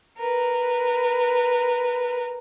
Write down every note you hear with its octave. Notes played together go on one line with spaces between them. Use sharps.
A#4 B4